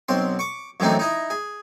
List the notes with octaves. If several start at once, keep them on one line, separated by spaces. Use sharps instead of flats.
B1 C4 C6
C#6 D6
F#2 A2 E3 C4 D4 D#4
D#4 E4 D#5
G#4